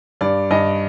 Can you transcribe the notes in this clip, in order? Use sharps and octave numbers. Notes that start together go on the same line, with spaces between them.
G2 D5
G2 D#5